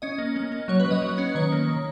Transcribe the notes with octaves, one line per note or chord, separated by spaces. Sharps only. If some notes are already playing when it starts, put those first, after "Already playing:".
C#4 D#5
A#3
A#3
A#3
F#3 C#5
B4
F#3
D#5
F#3
C#4
D#3 C#5
A#3
D#3